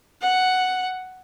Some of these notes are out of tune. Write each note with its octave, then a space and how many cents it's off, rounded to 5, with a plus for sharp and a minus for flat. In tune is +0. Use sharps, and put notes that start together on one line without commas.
F#5 +5